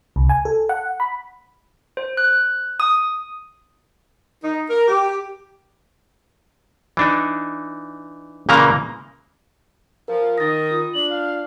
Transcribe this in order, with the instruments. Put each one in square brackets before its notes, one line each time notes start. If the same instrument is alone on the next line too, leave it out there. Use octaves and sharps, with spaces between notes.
[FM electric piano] C2
G#5
A4
F#5
B5
[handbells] C5
F#6
D#6
[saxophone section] D#4
A#4
G4
[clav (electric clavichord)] E3 D4 D#4
A#2 C#3 E3 A#3 A#5
[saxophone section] F3 [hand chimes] A#4
[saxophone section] D#3 [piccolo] D#6 [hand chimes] A6 A#6
[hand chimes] F4
[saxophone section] D4 [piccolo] F#7
[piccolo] F5